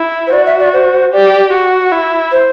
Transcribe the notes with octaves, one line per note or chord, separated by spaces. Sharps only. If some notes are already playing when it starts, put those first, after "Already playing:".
Already playing: E4
C5
F#4 D5
E5
D5
C5
C5
G4 D5
F#4
E4
C5